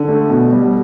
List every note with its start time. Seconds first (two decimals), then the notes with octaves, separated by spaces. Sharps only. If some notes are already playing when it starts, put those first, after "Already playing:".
Already playing: D3
0.08 A3
0.30 B2
0.52 G3